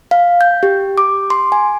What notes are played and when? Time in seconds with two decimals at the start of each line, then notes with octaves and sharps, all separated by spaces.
0.11 F5
0.41 G6
0.63 G4
0.98 D6
1.30 C6
1.52 G#5